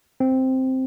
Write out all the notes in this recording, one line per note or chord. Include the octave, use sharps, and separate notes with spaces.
C4